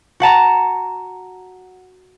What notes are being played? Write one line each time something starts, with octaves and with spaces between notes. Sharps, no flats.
F#4 F#5 A5 A#5